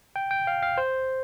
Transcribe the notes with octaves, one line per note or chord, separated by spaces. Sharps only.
G5
G5
F5
F5
C5